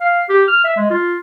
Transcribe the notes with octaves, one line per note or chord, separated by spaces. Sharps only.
F5
G4
F6
E5
G#3
F4